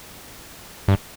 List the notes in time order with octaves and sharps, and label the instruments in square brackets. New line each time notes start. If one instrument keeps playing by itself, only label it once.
[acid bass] G2